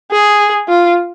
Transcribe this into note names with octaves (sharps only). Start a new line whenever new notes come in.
G#4
F4